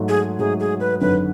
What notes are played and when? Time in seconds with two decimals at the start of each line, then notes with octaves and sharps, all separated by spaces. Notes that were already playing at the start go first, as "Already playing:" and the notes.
Already playing: G#2 F#3 A3
0.09 G#4
0.39 G#2 F#3 A3 G#4
0.60 G#4
0.80 B4
1.01 G#1 F#2 D3 F#3 B4